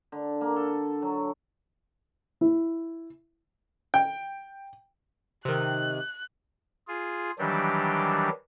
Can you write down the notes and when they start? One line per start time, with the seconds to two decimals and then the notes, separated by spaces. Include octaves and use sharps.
0.12 D3
0.41 A#3
0.56 A4
1.02 F#3
2.41 E4
3.94 G5
5.45 C3 D#3 F#6
6.88 F4 G#4
7.39 D#3 E3 F#3 G3 D4 G4